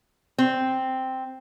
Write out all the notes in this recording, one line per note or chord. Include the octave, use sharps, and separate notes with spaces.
C4